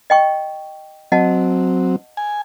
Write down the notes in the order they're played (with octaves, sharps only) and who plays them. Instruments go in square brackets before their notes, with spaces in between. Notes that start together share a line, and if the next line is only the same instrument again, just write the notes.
[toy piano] D#5 G5 C#6
[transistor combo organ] F#3 C4 [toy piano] D#5 F#5 A5
[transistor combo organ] G#5